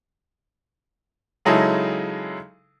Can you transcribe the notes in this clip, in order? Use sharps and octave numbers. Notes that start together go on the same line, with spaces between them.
C#3 F#3 G#3 D#4 E4 A4